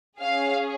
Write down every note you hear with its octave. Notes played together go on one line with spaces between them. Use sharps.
C#4 G#4 F5